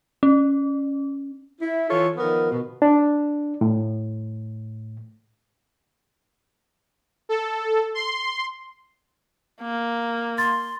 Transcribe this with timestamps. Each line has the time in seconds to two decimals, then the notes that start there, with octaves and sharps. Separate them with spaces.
0.23 C#4
1.61 E4
1.90 E3 F4 A4 C#5
2.17 D#3 F3 B3 A#4
2.51 B2
2.82 D4
3.61 A2
7.29 A4
7.94 C6
9.62 A#3
10.38 C6 A6